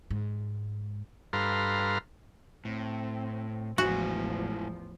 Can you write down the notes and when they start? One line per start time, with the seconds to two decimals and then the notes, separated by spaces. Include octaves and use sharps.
0.10 G#2
1.33 G2 A4 B4 F5 A#5 C6
2.65 A2 C4
3.78 A1 E2 F3 G#3 E4 F#4 G#5